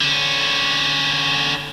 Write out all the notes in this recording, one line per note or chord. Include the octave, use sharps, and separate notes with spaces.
D3 C#4